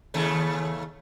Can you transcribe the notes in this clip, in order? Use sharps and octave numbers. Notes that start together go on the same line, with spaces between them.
D#2 C#3 A3